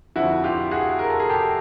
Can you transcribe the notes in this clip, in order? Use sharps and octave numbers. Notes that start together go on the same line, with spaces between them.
F2 D3 F3 E4 F#4
F4 G4
F#4 G#4
A#4
A4
G#4
G4 A4